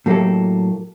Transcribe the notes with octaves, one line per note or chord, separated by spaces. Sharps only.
A2 F#3 A#3 F#4 G4 A4